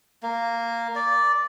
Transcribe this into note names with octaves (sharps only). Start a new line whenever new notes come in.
A#3
D5